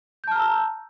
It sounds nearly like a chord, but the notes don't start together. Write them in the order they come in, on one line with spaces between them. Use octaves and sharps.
G6 A5 F6 A#5 E6